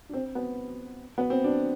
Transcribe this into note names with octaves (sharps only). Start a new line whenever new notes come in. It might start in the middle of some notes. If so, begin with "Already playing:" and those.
D4
C4
B3
B3
C4
D4